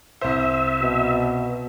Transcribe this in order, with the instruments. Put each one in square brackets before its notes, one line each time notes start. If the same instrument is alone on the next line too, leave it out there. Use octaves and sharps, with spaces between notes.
[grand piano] C2 C5 [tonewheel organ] E5
[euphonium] B2